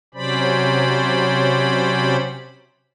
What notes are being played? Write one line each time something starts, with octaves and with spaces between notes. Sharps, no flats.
C3 F#3 C#4 C5 D5 B5